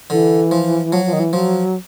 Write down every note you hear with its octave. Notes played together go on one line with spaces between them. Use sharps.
D3 E3
F3
F3 F#3
F3
D#3
E3
F3 F#3